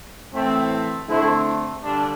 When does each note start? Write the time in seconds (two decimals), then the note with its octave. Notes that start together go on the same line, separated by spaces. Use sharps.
0.34 A2 E3 A3 C4
1.08 D3 A3 C4 E4
1.82 G2 D3 D4